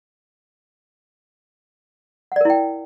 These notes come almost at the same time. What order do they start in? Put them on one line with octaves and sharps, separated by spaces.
F#5 D5 A#4 E4 G5